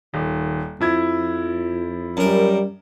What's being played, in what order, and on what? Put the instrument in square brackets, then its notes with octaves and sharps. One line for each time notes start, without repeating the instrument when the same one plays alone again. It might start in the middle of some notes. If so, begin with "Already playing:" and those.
[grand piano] D#1 [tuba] D#3
[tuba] F2 [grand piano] F3 E4 G#6
[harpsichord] F#2 A#4 [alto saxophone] G3